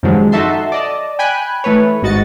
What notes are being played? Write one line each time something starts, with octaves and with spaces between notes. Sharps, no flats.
F#2 C3 D#3 F3 F#3 G#3
D#4 F#4 A4 E5 A5 C6
D5 D#5 A5
G5 G#5 B5 F#6
E3 A3 B4 C#5
G#1 G#2 F#4 D#5 A6 C#7